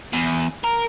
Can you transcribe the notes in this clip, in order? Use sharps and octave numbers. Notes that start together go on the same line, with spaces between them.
E2
A#4